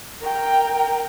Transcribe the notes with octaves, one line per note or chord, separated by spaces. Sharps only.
A#4 G5